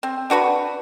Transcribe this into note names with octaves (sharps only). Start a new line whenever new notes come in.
C4
D4 F#4 B4 B5